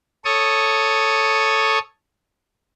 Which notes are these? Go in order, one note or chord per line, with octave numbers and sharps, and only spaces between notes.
A4 C#5 C#6 D#6